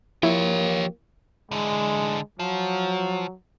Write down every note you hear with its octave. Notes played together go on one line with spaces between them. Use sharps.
F3 A#3 E4 G4 C#5
D3 E3 G#3
F3 F#3